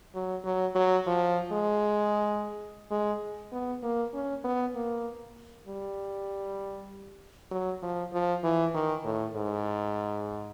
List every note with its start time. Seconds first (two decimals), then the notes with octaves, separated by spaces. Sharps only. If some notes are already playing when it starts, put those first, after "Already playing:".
0.15 F#3
0.45 F#3
0.75 F#3
1.07 F3
1.52 G#3
2.91 G#3
3.52 B3
3.83 A#3
4.13 C#4
4.44 B3
4.75 A#3
5.67 G3
7.51 F#3
7.82 F3
8.13 F3
8.44 E3
8.74 D#3
9.05 A2
9.36 G#2